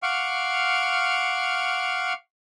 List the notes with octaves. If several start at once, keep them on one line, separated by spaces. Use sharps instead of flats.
F5 F#5 C#6 D6 F6